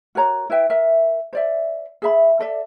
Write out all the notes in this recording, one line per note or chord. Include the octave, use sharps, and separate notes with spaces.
F#4 A#4 C#5 A#5
E4 B4 E5 G5
A#4 E5
C5 D5 E5
G#4 E5 B5
A4 D5 E5